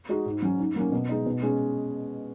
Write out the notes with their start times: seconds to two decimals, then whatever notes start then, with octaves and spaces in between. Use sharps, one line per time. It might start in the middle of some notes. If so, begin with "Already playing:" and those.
0.09 G#3 D#4 F#4
0.26 G#2
0.42 F#3 C#4
0.59 G#2
0.76 F#3 A#3 C#4
0.92 B2
1.09 G#3 D#4
1.26 B2
1.42 G#3 C#4